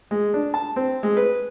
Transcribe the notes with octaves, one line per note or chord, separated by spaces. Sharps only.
G#3
D4
A5
C4
G#3
B4